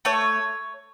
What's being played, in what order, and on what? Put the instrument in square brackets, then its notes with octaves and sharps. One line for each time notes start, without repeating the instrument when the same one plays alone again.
[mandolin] A3 C#5